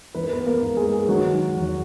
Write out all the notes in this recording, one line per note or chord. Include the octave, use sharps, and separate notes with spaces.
E3 B4
A#4
B3 B4
A#3 A#4
G#2
G#3 G#4
D#3 F#3 F#4
E2